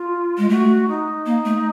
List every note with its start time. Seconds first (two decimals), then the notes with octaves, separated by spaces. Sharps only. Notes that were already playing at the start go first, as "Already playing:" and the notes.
Already playing: F4
0.38 G#3
0.49 A3 F#4
0.88 D#4
1.26 A#3
1.45 A3